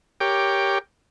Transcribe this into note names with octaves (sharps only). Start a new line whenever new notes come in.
G4 A#4 C#5 G5 D6